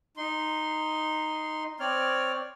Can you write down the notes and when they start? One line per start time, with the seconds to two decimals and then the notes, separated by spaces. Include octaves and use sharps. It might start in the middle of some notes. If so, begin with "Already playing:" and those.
0.17 D#4 C6
1.80 C4 C#5 D5 F6